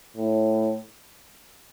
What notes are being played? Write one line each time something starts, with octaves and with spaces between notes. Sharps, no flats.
A2